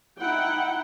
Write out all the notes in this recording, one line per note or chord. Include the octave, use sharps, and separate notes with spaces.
D#4 E4 F#5 G5